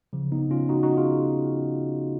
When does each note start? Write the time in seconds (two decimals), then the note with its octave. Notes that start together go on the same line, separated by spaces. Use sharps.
0.13 C#3 F3
0.32 B3 D#4
0.51 C#4 F4
0.69 D#4 F#4
0.83 D#4 F#4
0.97 F4 G#4